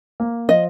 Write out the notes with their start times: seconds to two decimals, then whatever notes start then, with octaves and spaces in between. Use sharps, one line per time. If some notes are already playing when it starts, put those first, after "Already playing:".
0.20 A#3
0.49 F3 D#5